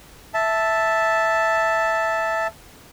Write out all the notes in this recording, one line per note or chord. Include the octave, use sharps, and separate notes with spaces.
E5 A5